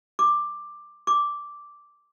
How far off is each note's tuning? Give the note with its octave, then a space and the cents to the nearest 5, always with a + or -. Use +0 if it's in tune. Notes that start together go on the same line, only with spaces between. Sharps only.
D6 +10
D6 -5